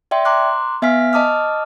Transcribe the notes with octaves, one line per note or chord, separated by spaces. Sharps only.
D5 E5 G5 C6
A#5 C6 D6 F#6
B3 E5 F5 G#5 F6 B6
D#5 A5 D6 D#6 F6